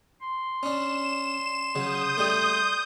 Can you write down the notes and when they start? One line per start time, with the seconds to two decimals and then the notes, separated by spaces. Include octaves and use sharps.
0.22 C6
0.63 C#4 D4 E7
1.75 C#3 F#3 D#6 G6
2.18 G3 A3